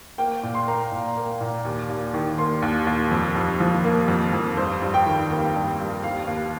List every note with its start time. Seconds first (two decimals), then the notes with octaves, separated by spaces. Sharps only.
0.18 A#3 G5
0.43 A#2
0.54 C6
0.68 A#3 A#5
0.92 A#2
1.17 A#3
1.41 A#2
1.65 D#2
1.90 D#2
2.14 D#3
2.38 A#3 C6
2.62 D#2
2.87 D#2
3.11 F2
3.36 F2
3.60 F3
3.84 A#3
4.08 F2
4.33 F2
4.57 G2 C5
4.82 G2
4.94 G5
5.06 D#3
5.30 A#3
5.55 G2
5.79 G2
6.04 D#2 F5
6.27 D#2